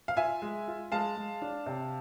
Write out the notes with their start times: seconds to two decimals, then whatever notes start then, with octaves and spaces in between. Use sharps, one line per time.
0.08 F5
0.17 F4 E5 G#5
0.42 G#3
0.68 F4
0.92 G#3 F5 A5
1.17 G#3
1.42 D4
1.66 C3